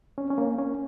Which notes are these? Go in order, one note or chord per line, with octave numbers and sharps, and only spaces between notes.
C#4
C#4
A#3
C#4